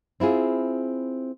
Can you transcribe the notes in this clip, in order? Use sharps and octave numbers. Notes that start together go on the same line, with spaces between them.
C4 E4 F4 G#4